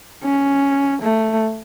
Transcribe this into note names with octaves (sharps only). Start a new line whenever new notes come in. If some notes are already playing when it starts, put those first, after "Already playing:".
C#4
A3